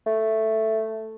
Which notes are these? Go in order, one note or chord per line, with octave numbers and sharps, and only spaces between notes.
A3